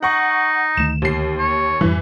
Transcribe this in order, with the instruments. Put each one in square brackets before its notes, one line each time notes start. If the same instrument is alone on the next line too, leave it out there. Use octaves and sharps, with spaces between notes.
[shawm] D#4 [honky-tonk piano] F#5 C#6
[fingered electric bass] D2 D#3 A3 [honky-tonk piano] E7
[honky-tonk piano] D#2 C7
[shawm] C#5
[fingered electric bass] F2 G#2 G3 [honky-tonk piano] E3